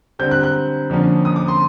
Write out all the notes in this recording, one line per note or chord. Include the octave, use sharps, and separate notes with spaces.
D3 G3 C4 G6
F#6
F#6
F2 D3 F3 A#3 C#4
D#6
D6
C6